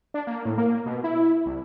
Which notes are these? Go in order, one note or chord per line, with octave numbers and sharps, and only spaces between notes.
D4
A#3
A2
A#3
B2
E4
C2